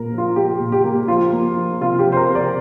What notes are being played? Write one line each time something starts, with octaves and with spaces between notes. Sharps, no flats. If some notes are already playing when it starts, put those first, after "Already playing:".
Already playing: A#2 A#3 A#4
F3
F4
A#3 G4
A#2
G4
A#3
F3 F4
A#3
F3
C3 F4
G4
F3
C5
A#4
C3
D5